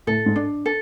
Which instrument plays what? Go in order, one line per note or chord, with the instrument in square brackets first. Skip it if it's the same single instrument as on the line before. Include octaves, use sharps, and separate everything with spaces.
[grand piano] A2 [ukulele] A4
[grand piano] G#2
[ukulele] D4
A4